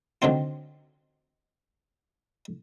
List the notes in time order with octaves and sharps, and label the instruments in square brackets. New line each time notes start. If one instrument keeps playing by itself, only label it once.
[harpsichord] D3 D#3 F#3 C4 F4